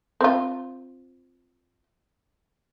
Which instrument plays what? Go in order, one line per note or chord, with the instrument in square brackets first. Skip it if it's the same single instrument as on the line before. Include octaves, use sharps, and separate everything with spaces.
[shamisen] C4 F4